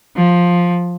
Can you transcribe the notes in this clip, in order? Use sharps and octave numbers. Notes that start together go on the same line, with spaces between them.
F3